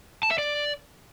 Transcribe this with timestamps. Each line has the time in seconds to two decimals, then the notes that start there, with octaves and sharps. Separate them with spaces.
0.23 A5
0.31 E5
0.38 D5